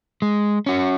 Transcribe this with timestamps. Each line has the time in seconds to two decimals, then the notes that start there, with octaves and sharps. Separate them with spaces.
0.22 G#3
0.66 C#4 F#4